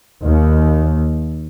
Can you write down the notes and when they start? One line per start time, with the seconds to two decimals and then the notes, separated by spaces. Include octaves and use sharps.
0.22 D#2